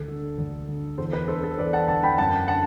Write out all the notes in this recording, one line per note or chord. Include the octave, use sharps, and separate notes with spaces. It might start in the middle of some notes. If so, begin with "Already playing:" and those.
Already playing: D2 A4
D3
D2
D3
E2 A4 C5
B4
D3 A4 C5
A4 C5
E2 B4 D5
F#5 A5
D3 F#5 A5
G5 B5
F#2 F#5 A5
D3 F#5 A5